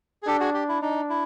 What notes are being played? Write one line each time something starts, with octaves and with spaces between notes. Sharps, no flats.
G#4
D4 G4 A4
F#4 G#4
G4
E4
D4 D#4
E4